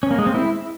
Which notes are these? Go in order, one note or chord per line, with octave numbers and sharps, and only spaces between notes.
C#4
A#3
G#3
C4
E4